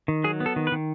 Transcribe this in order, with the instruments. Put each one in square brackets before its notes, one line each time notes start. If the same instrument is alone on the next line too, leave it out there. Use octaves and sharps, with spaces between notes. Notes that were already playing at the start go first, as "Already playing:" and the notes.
[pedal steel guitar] D#3
F#3 G#4
B3
A4
D#3
B4
D#3